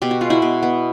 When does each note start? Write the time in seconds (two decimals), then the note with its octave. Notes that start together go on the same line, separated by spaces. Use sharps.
0.02 B2 G4
0.11 F#4
0.21 G#3 F4
0.30 E4 F#4
0.42 B2
0.63 B3